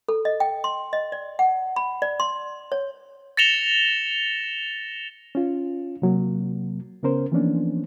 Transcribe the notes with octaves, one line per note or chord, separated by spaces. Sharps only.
A4
D#5
G5
C6
D#5
D5
F#5
B5
D5
C6
C#5
A6 A#6 C#7 E7 F7 G7
C#4 F4
C3 F#3 A#3
C#3 B3 C#4 A#4 C5
E3 F3 A#3 B3 C#4 D4